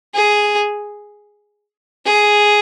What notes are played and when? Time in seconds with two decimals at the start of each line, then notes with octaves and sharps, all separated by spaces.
0.15 G#4
2.06 G#4